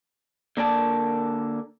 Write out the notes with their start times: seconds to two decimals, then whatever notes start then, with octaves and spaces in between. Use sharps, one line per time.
0.57 D3 A#3 A#4 D5 A5